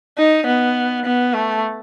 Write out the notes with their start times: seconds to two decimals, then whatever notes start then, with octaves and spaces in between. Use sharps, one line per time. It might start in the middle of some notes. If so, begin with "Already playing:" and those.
0.18 D#4
0.47 B3
1.06 B3
1.34 A3